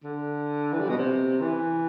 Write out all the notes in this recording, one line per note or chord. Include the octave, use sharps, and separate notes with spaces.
D3
E3
G3
B2
C3
E3